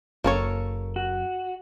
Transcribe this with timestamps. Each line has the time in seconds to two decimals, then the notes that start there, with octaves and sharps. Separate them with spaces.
0.24 F#1 F#2 A#3 A4 C#5
0.96 F#4